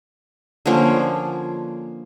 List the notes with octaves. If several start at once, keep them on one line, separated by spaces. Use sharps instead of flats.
D3 F3 A#3 C#4